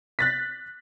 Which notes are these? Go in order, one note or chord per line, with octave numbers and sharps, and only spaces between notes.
F#6 A6 B6